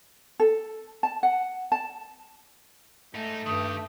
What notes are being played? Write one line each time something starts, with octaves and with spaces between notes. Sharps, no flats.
A4
A5
F#5
A5
G#2 A3 D#4
G2 D#3 G4 D#6